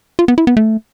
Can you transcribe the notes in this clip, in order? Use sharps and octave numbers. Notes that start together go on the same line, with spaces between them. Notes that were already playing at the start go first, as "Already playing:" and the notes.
F4
B3
E4
B3
A3